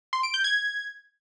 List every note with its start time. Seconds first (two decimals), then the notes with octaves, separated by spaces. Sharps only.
0.13 C6
0.23 D7
0.34 G6
0.44 G#6